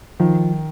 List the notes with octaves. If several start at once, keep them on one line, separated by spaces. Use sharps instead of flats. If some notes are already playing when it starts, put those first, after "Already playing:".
D#3 F3